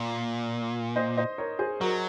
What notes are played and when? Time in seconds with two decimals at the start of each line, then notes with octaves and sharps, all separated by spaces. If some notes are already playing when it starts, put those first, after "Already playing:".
Already playing: A#2
0.96 C5 D#5
1.17 C5 D#5
1.38 A#4 C#5
1.59 G#4 C5
1.81 F#3 F#4 A#4